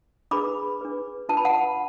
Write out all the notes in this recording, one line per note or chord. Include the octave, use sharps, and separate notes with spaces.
D4 G#4 B4 B5 D6
D4 G#4 B4
D4 F4 B4 A5
B5
F#5 A5